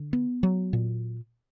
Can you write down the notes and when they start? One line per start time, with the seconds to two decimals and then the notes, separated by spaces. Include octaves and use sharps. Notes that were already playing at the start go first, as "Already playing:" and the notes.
Already playing: D3
0.13 B3
0.43 F#3
0.73 A#2